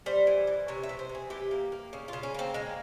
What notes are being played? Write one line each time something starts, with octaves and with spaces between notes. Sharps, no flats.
G3 C5
E3
E3
C3 C#5
E5
C3
C5
C3
G#4
E3 G4
A#3
A#3
C#3
F4
C#3
C#4
A#3 C4
G#3 A#4